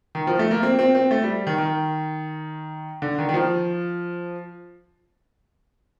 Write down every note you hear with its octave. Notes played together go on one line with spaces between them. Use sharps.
D#3
F3
A3
A#3
C4
C4
C4
A3
G3
D#3
D#3
D3
D#3
D#3
F3